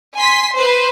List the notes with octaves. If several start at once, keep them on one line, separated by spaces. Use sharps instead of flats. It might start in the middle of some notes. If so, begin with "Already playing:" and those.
G#5 C6 B6
B4 C5